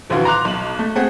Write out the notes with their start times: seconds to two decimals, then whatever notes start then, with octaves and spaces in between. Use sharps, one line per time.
0.10 D#1 A#1 D3 E3 F4 F#4
0.25 A#5 C6 D6 F#6 F7
0.45 B1 F#7
0.79 A3
0.95 A3 C4 G#4 F#5